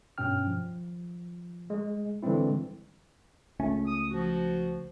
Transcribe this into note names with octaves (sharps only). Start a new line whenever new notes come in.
G2 B2 C#4 G5 F6
F3
G#3
D3 E3 G3 G#3 C4 E4
C#2 A3 C#4
D#6
F3 F#4